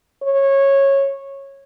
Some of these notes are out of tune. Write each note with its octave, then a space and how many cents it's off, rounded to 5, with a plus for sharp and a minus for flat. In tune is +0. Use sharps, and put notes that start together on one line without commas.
C#5 -15